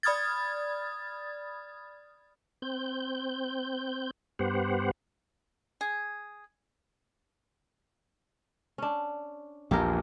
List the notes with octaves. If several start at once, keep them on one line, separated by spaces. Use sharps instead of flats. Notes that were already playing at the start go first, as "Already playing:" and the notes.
D5 B5 D#6 F6 G#6 A6
C4 G6
G2 B3 G4 C5 F#5
G#4
C#4 D4
A#1 E2 G4 A4 A#4